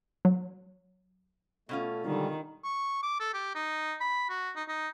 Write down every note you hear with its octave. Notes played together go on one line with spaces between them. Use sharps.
F#3
B2 A3 C#4 F4
D3 D#3 G3 G#3
C#6
D6
A4
G4
D#4
B5
F#4
D#4
D#4